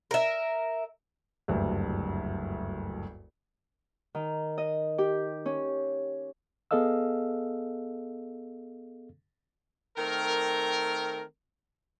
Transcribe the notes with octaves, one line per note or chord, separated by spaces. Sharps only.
A#4 E5
F#1 D2 G2
D#3
D#5
G4
C#4
B3 G#4 A4 D#5 F5 E6
D#3 A3 C4 A#4